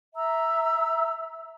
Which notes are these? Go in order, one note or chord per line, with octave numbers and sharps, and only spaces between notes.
E5 A#5 E6